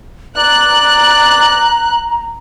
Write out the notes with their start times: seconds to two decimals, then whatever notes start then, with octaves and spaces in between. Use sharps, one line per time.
0.37 D5 A#5 F#6